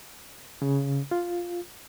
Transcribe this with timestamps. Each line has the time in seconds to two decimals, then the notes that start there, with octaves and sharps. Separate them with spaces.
0.62 C#3
1.11 F4